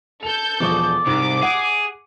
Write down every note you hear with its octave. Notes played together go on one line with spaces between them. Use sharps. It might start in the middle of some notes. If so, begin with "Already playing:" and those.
A4 G6 F7
E1 F3 D5 D#5 C#6
C2 G#2 D6
G#4 F#5